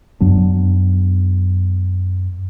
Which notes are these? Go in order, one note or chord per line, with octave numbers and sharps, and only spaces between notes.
F#2 F#3 B3 D4